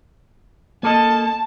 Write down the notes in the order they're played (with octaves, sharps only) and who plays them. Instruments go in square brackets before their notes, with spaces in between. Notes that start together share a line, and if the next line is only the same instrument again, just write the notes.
[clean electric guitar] A#3 A4 D#5 [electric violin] A5